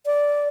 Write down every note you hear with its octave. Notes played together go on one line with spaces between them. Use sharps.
D5